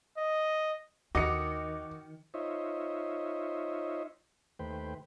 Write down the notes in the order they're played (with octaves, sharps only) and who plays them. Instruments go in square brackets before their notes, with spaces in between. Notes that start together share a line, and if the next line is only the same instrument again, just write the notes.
[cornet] D#5
[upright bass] D#2 [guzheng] D#3 [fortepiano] D#4 F#4 D#5 [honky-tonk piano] D6 C#7
[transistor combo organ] D#4 F4 C5 C#5 D#5 E5
D#2 A3 B4 C5 G5